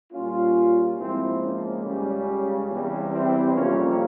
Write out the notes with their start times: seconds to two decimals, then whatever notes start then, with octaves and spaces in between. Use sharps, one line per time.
0.13 A#2 G3 A#3 C#4 F4
0.98 G#2 F3 A#3 C4 E4
1.42 C#4
1.84 C#2 C#3 G3
2.70 E2 C3 G3
3.12 C4 E4
3.55 F2 C3 G3 A#3 C#4 F4